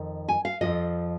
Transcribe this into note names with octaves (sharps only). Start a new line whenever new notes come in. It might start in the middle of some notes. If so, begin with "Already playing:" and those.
Already playing: F2 D#3
G#5
F5
F2 C#3 F3 D#5